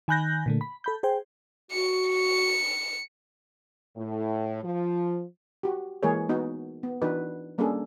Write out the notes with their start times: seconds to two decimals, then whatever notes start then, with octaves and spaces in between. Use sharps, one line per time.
0.08 D#3 G#5 B5 F#6 G6 A#6
0.46 A#2 D3 A3
0.61 B5
0.84 A4 B5 G6
1.03 G#4 C5 G5
1.71 F#4 C#7
2.10 C#7
3.97 A2
4.64 F3
5.63 F#4 G4
6.03 E3 G#3 A#3 G#4 A#4 C#5
6.29 B3 D#4 F#4
6.83 B3
7.02 E3 D4 D#4 F#4 B4
7.58 G3 A#3 C#4 D4 G#4 A4